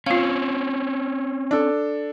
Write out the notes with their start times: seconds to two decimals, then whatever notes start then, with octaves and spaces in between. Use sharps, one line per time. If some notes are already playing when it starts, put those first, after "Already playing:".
0.06 C4 C#4 F4 F5
1.51 D4 A4